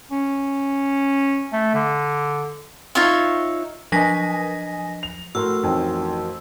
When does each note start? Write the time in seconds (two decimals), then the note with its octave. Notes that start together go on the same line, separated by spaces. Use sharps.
0.11 C#4
1.53 A3
1.75 D3
2.95 D#4 F4 C#5 E5
3.92 F3 F#3 D4 D#5 G#5 A#5 A#6 B6
5.03 F7
5.35 A2 F#4 A#4 C6 E6
5.63 A1 F2 D#4 G5